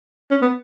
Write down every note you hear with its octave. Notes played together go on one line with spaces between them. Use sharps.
C#4
B3